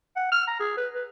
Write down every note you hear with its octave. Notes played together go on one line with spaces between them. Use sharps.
F#5
F6
A#5
G#4
B4
B4